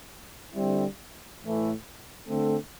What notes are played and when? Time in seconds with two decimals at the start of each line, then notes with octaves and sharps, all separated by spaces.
0.54 D3 G3 C4 E4
1.41 A2 E3 A3
2.27 D3 A3 C4 A4